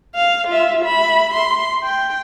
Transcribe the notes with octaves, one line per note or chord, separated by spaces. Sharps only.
F5
F4 E5
E5 B5
C6
G5